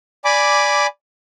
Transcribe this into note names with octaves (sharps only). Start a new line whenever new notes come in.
D5 G#5 B5 D6